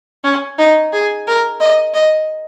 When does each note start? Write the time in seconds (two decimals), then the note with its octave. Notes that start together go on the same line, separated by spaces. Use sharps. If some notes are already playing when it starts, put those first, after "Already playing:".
0.24 C#4
0.58 D#4
0.93 G#4
1.27 A#4
1.60 D#5
1.94 D#5